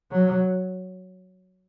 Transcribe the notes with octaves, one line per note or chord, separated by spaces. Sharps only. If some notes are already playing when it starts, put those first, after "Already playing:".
F#3